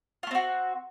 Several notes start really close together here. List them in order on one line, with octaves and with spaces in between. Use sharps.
F4 A3 C4 F#4